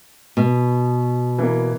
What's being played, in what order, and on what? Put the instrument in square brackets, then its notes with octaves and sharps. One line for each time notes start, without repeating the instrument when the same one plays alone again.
[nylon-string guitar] B2
[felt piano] E3 A#3